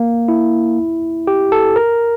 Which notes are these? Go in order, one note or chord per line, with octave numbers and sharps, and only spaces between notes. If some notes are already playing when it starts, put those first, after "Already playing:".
Already playing: A#3
E4
G4
A4
A#4